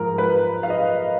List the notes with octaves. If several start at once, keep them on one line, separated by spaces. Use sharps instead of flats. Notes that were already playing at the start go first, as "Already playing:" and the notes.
Already playing: G#2 F3 G#3 A#4
B4
F5
D#5